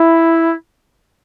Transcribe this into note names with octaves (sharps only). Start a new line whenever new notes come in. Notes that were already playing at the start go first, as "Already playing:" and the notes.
Already playing: E4